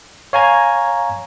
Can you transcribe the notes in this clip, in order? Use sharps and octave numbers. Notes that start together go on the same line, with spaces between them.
C#5 F5 G#5 A#5 G#6